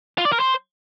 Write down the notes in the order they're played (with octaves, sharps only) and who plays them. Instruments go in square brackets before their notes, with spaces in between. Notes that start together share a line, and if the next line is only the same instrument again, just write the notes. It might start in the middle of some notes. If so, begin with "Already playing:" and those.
[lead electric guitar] F4
D5
A#4
C5